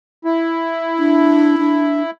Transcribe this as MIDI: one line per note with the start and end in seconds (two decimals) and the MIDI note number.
0.25 2.11 64
0.99 1.56 62
1.58 2.02 62